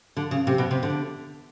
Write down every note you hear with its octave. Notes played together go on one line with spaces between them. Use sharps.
D3
C#3
C3
B2
C3
D3